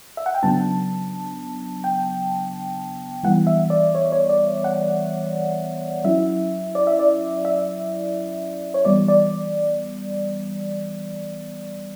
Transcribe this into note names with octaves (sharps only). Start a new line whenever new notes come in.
E5
F#5
G5
C#3 F#3 B3 D4 A5
G5
E3 G3 B3 F#5
E5
D5
C#5
C#5
D5
F#5
F#3 C#4 E4 E5
D5
E5
D5
E5
C#5
E3 G3 B3 D5
D5